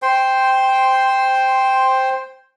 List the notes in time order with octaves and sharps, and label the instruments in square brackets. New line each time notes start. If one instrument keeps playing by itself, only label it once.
[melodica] C5 G5 C6